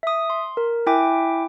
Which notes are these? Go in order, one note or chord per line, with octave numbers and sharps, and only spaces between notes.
E5 D#6
C6
A#4
E4 E5 G5 G#5 D6